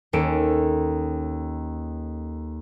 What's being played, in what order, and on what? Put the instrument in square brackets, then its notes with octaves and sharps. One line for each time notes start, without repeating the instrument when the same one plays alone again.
[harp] D#2 C#4 A4 D7 E7